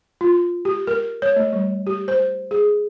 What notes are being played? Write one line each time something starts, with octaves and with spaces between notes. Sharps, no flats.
F4
G4
A#4
C#5
A3
G3
G4
C5
G#4